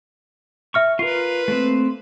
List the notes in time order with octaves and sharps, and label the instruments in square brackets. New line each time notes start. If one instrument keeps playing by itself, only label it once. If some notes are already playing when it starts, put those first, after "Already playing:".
[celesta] E5 F6 C#7 [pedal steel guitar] C#6
[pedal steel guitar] F4 A#4 [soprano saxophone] B4 [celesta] C7
[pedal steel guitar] A3 A#3 C4